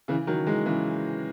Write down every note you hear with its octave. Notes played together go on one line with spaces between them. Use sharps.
C#3 E3
D#3 F#3
E3 G#3
C#3 E3